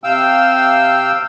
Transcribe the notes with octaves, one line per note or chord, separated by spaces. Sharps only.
C3 F5 G5 E6